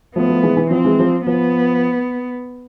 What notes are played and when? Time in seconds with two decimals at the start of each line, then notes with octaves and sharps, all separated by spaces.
0.15 F3 A3 B3
0.29 F3 A3
0.43 E3 G#3
0.57 E3
0.71 F3 C4
0.85 E3 G#3
0.99 F3
1.26 F3 B3